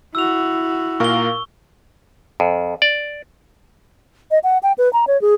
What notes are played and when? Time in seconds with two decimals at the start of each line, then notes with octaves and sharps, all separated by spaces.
0.15 E4 F#4 E6 F7
1.00 A#2 A#4 F5 C#6 G7
2.40 F2
2.82 D5
4.31 D#5
4.44 F#5
4.63 G5
4.78 B4
4.93 A#5
5.07 C#5
5.22 G#4